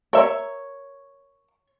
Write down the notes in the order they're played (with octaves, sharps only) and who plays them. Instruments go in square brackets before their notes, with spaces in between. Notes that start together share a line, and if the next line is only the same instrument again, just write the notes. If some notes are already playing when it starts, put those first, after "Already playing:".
[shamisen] A#4 E5 [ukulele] C#5